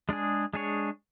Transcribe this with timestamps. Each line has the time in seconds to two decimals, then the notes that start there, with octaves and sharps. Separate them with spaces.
0.09 G#3 D4 G#4
0.53 G#3 D4 G#4 C#5